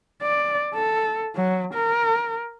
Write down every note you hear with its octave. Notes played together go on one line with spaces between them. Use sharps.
D5
A4
F#3
A#4